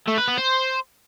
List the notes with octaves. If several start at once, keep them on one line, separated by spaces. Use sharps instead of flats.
A3
B4
B3
C5